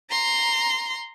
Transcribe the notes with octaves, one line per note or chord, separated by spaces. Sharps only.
A#5 C6